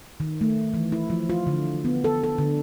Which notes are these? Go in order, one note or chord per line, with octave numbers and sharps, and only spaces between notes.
D#3
A3
E3
E4
F3
F4
D3
B3
A4
A4
D3